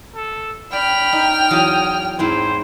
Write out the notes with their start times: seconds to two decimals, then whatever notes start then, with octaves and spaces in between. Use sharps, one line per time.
0.16 A4
0.73 D5 G5 B5 F6
1.13 D#4
1.51 E2 F#3 F5 D#6
2.19 G#2 C4 E4 C5